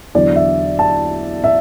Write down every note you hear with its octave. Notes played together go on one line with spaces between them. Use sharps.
E2 D3 F#3 D5
E5
A5
E5